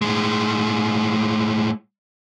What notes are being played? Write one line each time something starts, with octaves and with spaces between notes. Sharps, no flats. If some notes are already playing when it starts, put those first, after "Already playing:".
A2 G#3